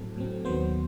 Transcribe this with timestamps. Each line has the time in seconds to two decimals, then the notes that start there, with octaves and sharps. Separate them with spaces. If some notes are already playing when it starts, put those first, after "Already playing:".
Already playing: A2 F#3 C4 A4
0.16 A2 F#3 C4
0.45 D#2 D#3 F#3 B3 C5